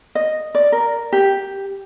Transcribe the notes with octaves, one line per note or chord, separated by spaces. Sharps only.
D#5
D5
A#4
G4